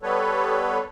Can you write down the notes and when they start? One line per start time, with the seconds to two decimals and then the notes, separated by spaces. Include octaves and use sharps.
0.03 G3 B3 A4 B4 C#5